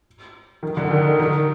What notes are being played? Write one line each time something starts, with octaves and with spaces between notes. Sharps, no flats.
D#3
D3
D#3
D#3